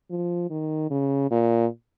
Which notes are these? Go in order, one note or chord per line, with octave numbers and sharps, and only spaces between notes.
F3
D#3
C#3
A#2